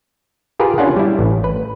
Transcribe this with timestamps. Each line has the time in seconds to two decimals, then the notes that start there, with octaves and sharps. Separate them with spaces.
0.59 F4 G4 G#4 A#4 B4
0.78 C#4 D4 F4 F#5
0.96 G3 E4
1.19 A1
1.44 B4